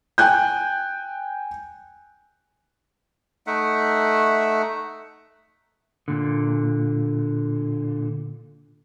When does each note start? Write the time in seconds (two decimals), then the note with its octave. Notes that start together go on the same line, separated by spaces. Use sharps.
0.18 G5 G#5 F#6 G6
3.47 A3 D#4 E5 F#5
6.08 A#2 D3